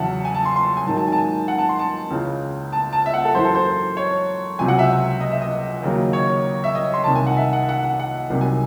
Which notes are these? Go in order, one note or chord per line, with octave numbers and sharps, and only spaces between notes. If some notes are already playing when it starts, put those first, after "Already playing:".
Already playing: E2 C#3 F#3 E5 F#5 A5
G#5
A5
C6
C6
G#5
G#2 D#3 F#3 A5
A5
G#5
A5
G#5
F#5
A5
C6
A5
C#2 C#3 E3
A5
A5
E5
F#5
A4
F#2 E3 C5
A4
C5
C#5
C#2 C3 F#3 G#5
F#5
E5
D#5
E5
D#5
D#2 C#3 F#3
C#5
E5
D#5
C6
C2 C3 D#3 A5
G#5
F#5
E5
F#5
F#5
F#5
F#5
C2 C3 D#3 F#3
G#5